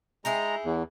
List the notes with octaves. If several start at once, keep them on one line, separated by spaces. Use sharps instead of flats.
G#3 D#4 E4 G#4 A#5
E2